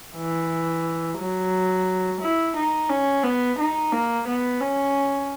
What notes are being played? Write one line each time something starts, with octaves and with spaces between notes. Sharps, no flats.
E3
F#3
E4
D#4
C#4
B3
D#4
A#3
B3
C#4